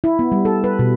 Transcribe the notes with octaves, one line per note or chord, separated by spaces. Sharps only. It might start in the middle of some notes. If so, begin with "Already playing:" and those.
E4
B3
G3
A4
B4
B2